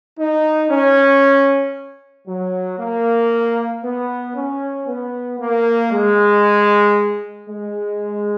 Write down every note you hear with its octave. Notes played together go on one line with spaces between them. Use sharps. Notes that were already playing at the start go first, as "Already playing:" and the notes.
D#4
C#4
F#3
A#3
B3
C#4
B3
A#3
G#3
G#3